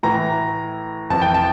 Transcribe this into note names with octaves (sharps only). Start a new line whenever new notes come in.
A2 E3 A#5
F2 E3 A5
G5
A5